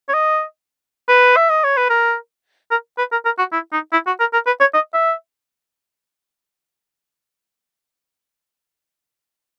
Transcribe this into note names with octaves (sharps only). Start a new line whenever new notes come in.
C#5
D#5
B4
E5
D#5
C#5
B4
A#4
A#4
B4
A#4
A#4
F#4
E4
D#4
E4
F#4
A#4
A#4
B4
C#5
D#5
E5